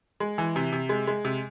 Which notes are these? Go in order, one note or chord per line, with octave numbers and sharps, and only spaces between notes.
G#3
E3
C3
C3
G#3
G#3
C3